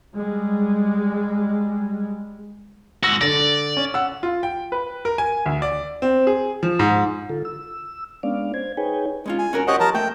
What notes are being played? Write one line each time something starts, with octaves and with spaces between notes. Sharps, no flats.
G3 G#3
G#2 F#4 E6 A#6 C#7
D3 D5 A#6
C#4
F#5 E6
F4
G5
B4
A#4
G#5
D2
D5
C4
G#4
F3
G#2
D3 F4 A4
E6
G#3 B3 C#4 D4 D5 F5
C5 G#6
D#4 G#4 B4 C#5 G5 G#5
G#3 C#4 F4
G#5
C#4 F#4 A#4
F#4 G4 C5 C#5 D#5 F#5
F3 A#4 A5 A#5
A3 E5 G5